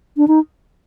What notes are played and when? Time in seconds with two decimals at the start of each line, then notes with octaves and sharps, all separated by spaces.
0.17 D4
0.28 D#4